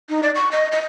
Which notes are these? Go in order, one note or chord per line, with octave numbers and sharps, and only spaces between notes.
D#4
D5
C#6
D#5
D#5